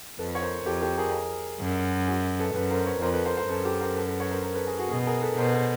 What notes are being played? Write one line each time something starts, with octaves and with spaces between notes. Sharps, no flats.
F2 A4 B4
C#5
A#4 C5
F2 G4 A4
G4 A4
G#4 A#4
F#2
F#4 G#4
A4 B4
F#2 A4 B4
A#4 C5
B4 C#5
F2 A#4 C5
A4 B4
A#4 C5
A#4 C5
F#2 A4 B4
G4 A4
A#4 C5
A4 B4
A4 B4
B4 C#5
A#4 C5
A#4 C5
A4 B4
G#4 A#4
F#4 G#4
B2 F#4 G#4
G#4 A#4
A4 B4
B2 A#4 C5
A#4 C5